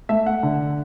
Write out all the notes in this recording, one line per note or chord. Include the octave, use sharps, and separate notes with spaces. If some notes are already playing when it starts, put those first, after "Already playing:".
A3 E5
F#5
D3